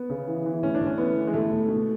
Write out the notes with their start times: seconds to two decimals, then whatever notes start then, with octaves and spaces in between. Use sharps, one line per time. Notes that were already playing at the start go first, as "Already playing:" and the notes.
Already playing: B3
0.10 C#3
0.28 E3
0.46 E3
0.63 A2 C#4
0.75 D4
0.81 A2
0.87 C#4
0.98 E3 B3
1.16 E3
1.27 G#3
1.33 A2 A3
1.51 A2
1.69 B2